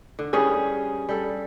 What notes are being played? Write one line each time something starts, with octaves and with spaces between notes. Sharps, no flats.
D3
G2 G3 C#4 G#4 D#6
G3 A4